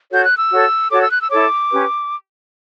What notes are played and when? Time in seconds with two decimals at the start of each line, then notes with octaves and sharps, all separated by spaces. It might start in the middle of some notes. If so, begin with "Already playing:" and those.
0.10 F#4 A4 C#5 G6
0.24 F#6
0.37 E6
0.51 F#4 A4 C#5
0.90 F#4 A4 C#5 D6
1.01 E6
1.11 F#6
1.20 E6
1.30 E4 A4 C#5 D6
1.71 C#4 G4 B4